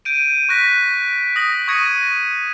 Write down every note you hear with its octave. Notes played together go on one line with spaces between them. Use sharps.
G6 D7 D#7
C#6 F#6 A#6 B6
D#6 A#6 F#7
C#6 D#6 G#6 A#6 C#7 D#7